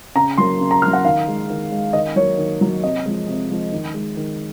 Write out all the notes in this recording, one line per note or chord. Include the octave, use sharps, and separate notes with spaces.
C#3 A#5
F#3 A#3 C6
C#3
A#5
F#3 A#3 F6
F#5
D#3 F5
G#3
D#3
G#3
D#3 D#5
F#3 A#3 C#5
D#3
F#3 A#3
C3 D#5
F3 G#3
C3
F3 G#3
D#3
G#3
D#3